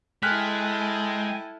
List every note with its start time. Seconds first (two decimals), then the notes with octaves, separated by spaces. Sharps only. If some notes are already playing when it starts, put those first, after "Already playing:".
0.23 G#3 E4 A4 G5 G#5 F6 F#6 B6